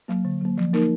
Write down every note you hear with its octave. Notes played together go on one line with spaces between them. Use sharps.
F#3 A#3
D3
F#3 A#3
F3
A#3 D#4 A#4